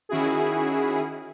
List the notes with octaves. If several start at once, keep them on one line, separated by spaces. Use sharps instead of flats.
D#3 C#4 E4 F#4 G#4